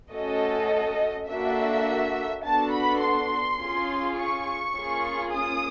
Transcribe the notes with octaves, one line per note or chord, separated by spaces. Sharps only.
A3 C#4 F#4 A4 D#5
A#3 D4 F#4 A4 E5
B3 D4 F#4 A4 A5
B5
C6
C#4 F4 G#4
C#6
A#3 C#4 F4 G#4
D#6